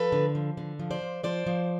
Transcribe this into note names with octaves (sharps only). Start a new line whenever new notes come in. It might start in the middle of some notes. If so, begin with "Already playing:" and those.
Already playing: F3 A4 B4
D3
F3
D3
F3
C5 D5
F3
F3 C5 D5
F3